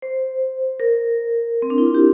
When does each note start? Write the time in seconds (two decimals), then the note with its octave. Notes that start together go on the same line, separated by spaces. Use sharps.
0.02 C5
0.80 A#4
1.62 C4
1.70 D4
1.78 E4
1.86 F4
1.94 G4